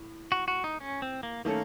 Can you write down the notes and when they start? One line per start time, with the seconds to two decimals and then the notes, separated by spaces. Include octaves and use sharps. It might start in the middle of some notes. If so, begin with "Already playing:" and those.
Already playing: A2
0.32 F#4
0.48 F#4
0.64 D#4
0.80 C#4
1.02 C4
1.23 A#3
1.45 D#3 A3 A#3 C#4 A4